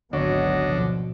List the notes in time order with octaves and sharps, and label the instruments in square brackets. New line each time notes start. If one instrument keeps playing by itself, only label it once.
[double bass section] G#1 F#3 B3 [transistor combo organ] D2 D3 [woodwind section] F#4 C#5 D#5
[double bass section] B2 F3